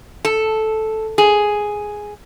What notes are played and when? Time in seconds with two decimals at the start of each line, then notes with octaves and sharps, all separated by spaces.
0.25 A4
1.18 G#4